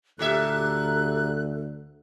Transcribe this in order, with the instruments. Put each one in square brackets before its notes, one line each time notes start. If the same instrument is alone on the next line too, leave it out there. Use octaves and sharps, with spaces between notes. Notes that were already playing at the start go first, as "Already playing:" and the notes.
[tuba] D2 [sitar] A#2 G4 E5 [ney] A4 [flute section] F#6